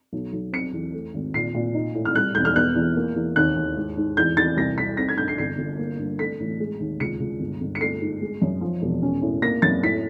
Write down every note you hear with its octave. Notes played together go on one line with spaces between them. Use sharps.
B1
B1
C4 C#7
E2
A3
G#1
A#2 C7
A#2
D#4
A2
F6
G3 F#6
E1 G6
F6
B3 F#6
E2
A#3
E2
D#2 F#6
D#2
G#2
G#2
E2 G6
E2 A6
C2 A#6
C2 B6
C4 A#6
G#6
G2 G6
C7
G1 C7
G1
A#3
G2
A3 B6
A1
G#3
D#2
C#2 C#7
C#2
G1
G1
C#7
A3 C7
G#2
G#3
F#2
F3
E1
C#4
A2
A#3 A#6
F#2 A6
A2 B6